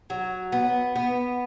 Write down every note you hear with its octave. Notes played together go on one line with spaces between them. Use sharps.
F#3
B3
B3